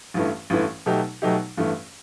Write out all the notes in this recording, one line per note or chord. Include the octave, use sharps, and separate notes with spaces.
A1 G2 E3 A3
A1 G2 E3 A3
B2 F#3 A3 D#4 G4
B2 F#3 A3 D#4 G4
A1 G2 E3 A3